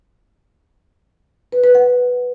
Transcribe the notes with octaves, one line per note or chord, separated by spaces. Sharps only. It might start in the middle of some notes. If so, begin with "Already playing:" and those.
B4
B4
F#5